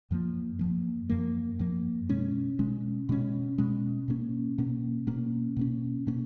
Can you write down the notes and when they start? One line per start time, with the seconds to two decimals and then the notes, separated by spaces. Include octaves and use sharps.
0.11 F#2 F3 A#3
0.59 F#2 F3 A#3
1.10 F#2 F3 A#3
1.59 F#2 F3 A#3
2.09 B2 G#3 C#4
2.59 B2 G#3 C#4
3.09 B2 G#3 C#4
3.58 B2 G#3 C#4
4.08 B2 A#3 C#4
4.58 B2 A#3 C#4
5.07 B2 A#3 C#4
5.57 B2 A#3 C#4
6.07 B2 A#3 C#4